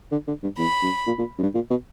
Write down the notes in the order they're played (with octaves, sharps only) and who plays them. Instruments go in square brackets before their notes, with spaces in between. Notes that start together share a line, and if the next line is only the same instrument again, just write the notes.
[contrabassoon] D3
D3
G2
[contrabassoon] E2 [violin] B5
[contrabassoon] F#2
A#2
A#2
F#2
G2
A#2
B2